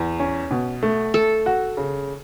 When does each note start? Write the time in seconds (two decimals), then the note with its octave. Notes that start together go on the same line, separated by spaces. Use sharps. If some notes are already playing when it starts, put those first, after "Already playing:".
Already playing: E2
0.20 C#4
0.51 B2
0.83 A3
1.14 A3 A4
1.46 F#4
1.77 C#3